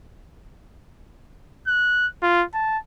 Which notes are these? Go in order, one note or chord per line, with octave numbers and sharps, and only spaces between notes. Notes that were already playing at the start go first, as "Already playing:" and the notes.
F#6
F4
A5